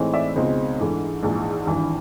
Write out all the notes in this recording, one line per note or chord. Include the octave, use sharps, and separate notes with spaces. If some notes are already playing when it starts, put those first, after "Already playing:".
Already playing: A2 E3 G#3 C4 D#4
D5 E5
C#2 B2 G#3 C4 D#4
G#2 E3 A3 D4
A#1 G#2 E3
G#1 G2 E3